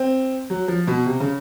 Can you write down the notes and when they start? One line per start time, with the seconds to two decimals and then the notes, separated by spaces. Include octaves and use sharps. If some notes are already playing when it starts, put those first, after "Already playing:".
Already playing: C4
0.50 F#3
0.68 F3
0.87 B2
1.06 C3
1.20 C#3